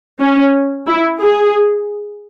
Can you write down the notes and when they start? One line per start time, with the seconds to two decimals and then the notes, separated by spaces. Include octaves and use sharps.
0.20 C#4
0.87 E4
1.20 G#4